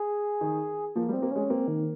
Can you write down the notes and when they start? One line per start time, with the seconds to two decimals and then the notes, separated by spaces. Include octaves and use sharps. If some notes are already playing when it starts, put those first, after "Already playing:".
Already playing: G#4
0.41 D#3
0.96 F3 A#3
1.09 G3
1.13 C4
1.22 A#3
1.32 G#3 C#4
1.50 A#3 C4
1.68 D#3